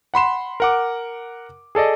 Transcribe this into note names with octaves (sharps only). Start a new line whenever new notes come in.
F#5 B5 C6 E7
A#4 F#5 D6
G#4 A4 D5 D#5